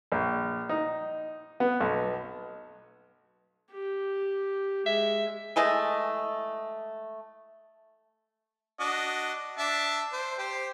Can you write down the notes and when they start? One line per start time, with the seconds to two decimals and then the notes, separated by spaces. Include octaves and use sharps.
0.12 A#1
0.69 D#4
1.60 B3
1.80 B1
3.72 G4
4.86 G#3 E5
5.56 E3 G#3 A3 D#5
8.80 D4 F#4 D#5
9.58 D4 E5 A5
10.13 C5
10.38 G4 C5